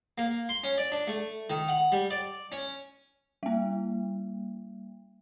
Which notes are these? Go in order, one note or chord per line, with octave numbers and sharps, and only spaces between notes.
A#3
C6
C#4
D5
D4
A3
D#3
F#5
G3
D5
C#4
G3 A#3